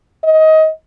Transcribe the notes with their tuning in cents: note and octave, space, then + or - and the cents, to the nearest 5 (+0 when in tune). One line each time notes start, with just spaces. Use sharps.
D#5 +20